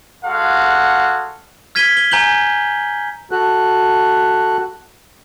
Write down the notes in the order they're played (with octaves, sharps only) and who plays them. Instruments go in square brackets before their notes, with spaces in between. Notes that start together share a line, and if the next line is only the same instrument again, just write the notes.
[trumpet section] G#3 F#4 A4 F5 F#5
[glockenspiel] F6 G#6 B6 D#7 G7
G7
G#5 A#5 G6 F#7 G7
[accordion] F#4 A4 F#6